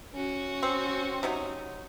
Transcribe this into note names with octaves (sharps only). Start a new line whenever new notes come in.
C#4 F#4
C4
C3 F#3 D#4